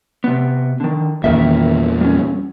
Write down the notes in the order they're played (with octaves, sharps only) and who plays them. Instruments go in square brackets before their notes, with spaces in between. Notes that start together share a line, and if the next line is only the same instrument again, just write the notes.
[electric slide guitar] C3 B3
D3 D#3
[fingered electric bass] E2 A#2 [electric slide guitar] D#3 A#4 E5
[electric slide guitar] G3 C#4